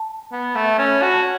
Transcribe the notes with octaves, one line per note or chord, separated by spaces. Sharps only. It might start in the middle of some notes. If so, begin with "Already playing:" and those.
Already playing: A5
B3
A3
C#4
B5
F#4 A5
A5